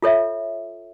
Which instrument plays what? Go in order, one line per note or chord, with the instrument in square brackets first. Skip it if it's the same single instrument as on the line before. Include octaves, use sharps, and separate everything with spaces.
[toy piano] F4 A4 C#5 E5